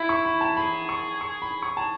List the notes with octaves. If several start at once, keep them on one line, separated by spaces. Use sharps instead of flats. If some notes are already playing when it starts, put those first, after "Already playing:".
Already playing: E4 B5
C#6
B5
A5
G#4 B5
C#6
C#6
B5
C#6
A5